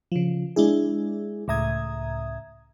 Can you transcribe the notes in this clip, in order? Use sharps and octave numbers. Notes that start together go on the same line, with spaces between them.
C#3 F3
G#3 D4 E4 G#4
C#2 A2 E5 A#5 D#6 G#6